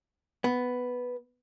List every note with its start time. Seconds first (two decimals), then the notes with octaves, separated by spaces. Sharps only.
0.44 B3